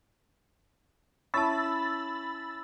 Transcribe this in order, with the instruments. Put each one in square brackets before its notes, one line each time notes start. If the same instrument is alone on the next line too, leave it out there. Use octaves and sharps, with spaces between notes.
[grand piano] C#4 E4 [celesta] A5 C#6 [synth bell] B5 E6 A6